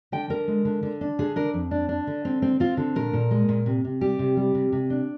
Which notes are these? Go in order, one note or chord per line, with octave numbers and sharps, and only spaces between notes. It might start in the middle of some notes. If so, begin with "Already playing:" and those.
D3 G5
D3 A#4
G#3
D3
D3
D4
D3 G#4
D4 A#4
F2
D4
D4
D3
C4
C4
C4 F4
D3
A#2 A#4
A#2
G#3
A#2
C3
C3
G3 G4
C3
G3
C3
C3
D4